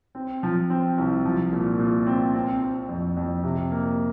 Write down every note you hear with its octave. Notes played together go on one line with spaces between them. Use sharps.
C4
F3
C4
C2
F3
A#2
A#2
C4
C4
C4
F2
F2
C3
A#3